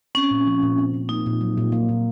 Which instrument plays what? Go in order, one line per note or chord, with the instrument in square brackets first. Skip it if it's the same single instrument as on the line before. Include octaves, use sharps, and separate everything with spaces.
[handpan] C4 [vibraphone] C#4
[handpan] A#2
F3
A#2
C4
A#2
[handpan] A#3 [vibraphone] D#4
[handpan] A#2
F#3
A#2
A#3
A#2